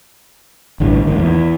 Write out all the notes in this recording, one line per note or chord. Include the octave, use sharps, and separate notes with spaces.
A1 D2 G2 E3
D#2 G#2 D#3
E2